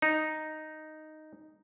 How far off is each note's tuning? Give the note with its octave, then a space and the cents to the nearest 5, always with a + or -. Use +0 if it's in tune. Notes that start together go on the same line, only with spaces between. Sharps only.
D#4 -5